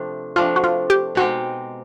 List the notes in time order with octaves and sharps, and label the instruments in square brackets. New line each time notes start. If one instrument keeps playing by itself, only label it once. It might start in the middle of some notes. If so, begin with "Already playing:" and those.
Already playing: [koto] C3 F3 A3 D4
[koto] C3 F3 A3 D4 [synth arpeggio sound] F4
[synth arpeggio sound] F#4
F4
G4
[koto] B2 G#3 C4 D#4 G4 [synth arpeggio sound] F#4